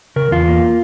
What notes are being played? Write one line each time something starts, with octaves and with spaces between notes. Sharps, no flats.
C#3 A#4
E2 F4
A#3